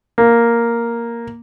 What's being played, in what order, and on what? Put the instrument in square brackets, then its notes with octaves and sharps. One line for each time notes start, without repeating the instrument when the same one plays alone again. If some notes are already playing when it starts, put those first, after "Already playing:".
[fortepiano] A#3